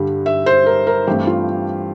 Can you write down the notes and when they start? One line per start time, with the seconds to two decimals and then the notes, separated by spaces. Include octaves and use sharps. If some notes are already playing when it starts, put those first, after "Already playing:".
Already playing: G2 D3 G3
0.26 E5
0.46 C5
0.66 A#4
0.87 A#4
1.07 G2 E3 A3 C4 G4
1.27 F4